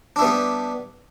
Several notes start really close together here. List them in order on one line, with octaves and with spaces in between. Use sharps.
D4 E4 B3 G3